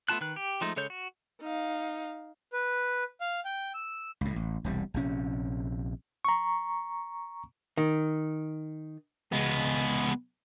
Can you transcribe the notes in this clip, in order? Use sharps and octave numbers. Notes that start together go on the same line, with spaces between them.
A3 B3 F4 A5 F#6
D#3 B4 F#6
G4
F3 G#3 A3 D#4
C#3 G#3 A4 C#5 G6
F#4
D#4 F5
B4
F5
G5
E6
C#2 A2
A1
E1 C2 G3
A#1 C3 C#4
A#5 C#6
D#3
C#2 G#3 B3